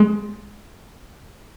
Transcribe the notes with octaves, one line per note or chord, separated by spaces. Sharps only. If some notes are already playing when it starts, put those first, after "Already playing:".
Already playing: G#3